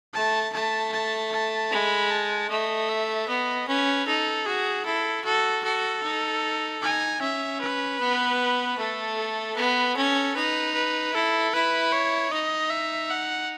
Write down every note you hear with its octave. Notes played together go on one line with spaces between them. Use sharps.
A3 A5
A3 A5
A5
A5
G#3 B5
A5
A3 D#5
E5
B3 D#5
C#4 B4
D#4 A4
F#4 G#4
E4 A4
F#4 A4
F#4 A4
D#4
D#4 G#5
C#4 E5
B4
B3
A3 A4
A4
B3 B4
C#4 A4
D#4 B4
B4
E4 A4
E4 B4
C#5
D#4 D#5
E5
F#5